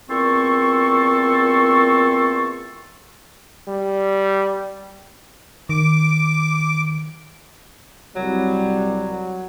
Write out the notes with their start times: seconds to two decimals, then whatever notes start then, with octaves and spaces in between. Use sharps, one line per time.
0.10 E2 A#2 C4 A4 C6 C#6
3.68 G3
5.69 D#3 D6
8.16 C2 F#3 G3